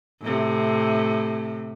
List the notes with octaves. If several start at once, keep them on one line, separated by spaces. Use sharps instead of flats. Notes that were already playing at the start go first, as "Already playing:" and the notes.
A2 C3